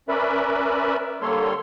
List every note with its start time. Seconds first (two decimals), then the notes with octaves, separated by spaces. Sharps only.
0.08 C#4 A#4 B4 D5 E5 B5
1.22 D3 G3 A#3 A4 C#5 C6